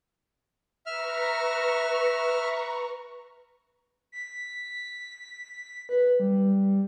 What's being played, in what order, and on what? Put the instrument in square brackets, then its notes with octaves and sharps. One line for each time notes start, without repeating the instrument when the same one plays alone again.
[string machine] B4 A#5 C#6 [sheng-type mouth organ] E5 F6
[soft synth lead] B6
B4
G3